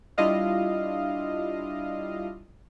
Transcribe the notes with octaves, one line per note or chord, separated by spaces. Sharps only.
G3 D4 E4 F4 D#5 F5